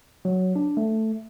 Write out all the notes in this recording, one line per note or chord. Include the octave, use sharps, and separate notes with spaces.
F#3
D4
A3